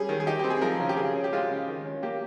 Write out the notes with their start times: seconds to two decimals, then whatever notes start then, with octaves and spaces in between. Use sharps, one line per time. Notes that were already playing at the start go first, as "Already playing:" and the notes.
Already playing: G3 C#4 G#4
0.09 D#3
0.20 G#4
0.27 D#4 G4
0.39 C4 G4
0.50 G#4
0.62 F3 A#4
0.80 C#3
0.89 G4
0.97 C#3 G#4
1.15 C#4
1.24 G4
1.32 G#3 F4
1.50 C#3
1.68 D#3
1.85 C#4
2.03 A#3 G4